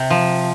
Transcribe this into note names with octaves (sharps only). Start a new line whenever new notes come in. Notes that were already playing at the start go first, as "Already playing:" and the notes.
Already playing: C3
F3